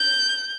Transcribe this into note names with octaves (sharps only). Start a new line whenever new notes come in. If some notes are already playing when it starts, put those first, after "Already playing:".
Already playing: G6